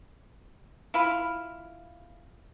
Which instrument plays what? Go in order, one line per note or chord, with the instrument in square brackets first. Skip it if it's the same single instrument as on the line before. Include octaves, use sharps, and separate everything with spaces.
[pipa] E4 F4 F5 B5